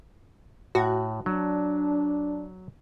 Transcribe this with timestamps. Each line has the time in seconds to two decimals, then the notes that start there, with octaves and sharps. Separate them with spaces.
0.75 A2 F#4
1.26 F#3 D4